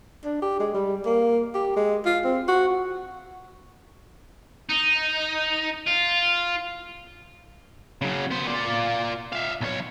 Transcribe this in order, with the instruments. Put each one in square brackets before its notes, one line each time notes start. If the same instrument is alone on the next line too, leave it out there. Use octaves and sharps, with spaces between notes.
[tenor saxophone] D4
G4
G#3
G3
A#3
G4
G#3
F4
C4
F#4
[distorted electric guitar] D#4
F4
[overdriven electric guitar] C#3 F#3
B3 C5
F4 D5
E5 F5
B1 C#5